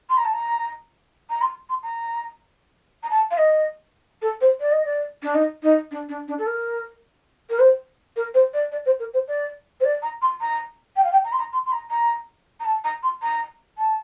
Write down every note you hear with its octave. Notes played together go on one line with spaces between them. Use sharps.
C6
A#5
A5
A#5
A#5
C6
C6
A#5
A#5
A5
F5
D#5
A4
C5
D5
D#5
D5
D4
D#4
D#4
D4
D4
D4
A4
A#4
A#4
C5
A#4
C5
D5
D5
C5
A#4
C5
D5
C5
D5
A#5
C6
A#5
G5
F5
G5
A#5
C6
A#5
C6
C6
A#5
A#5
A#5
A5
A#5
C6
A#5
A5